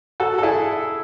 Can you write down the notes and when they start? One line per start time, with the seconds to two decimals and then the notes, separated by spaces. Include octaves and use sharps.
0.20 F#4 A4
0.38 A4
0.43 E4 G#4